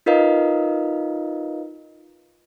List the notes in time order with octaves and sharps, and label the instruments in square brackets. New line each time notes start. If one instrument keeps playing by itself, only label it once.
[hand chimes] D#4 F4 A#4 B4 D#5 F5